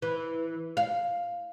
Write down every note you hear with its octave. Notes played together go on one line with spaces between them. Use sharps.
E3
F5